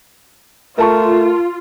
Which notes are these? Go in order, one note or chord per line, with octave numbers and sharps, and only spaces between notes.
A3 F4 A#4 A5 C#6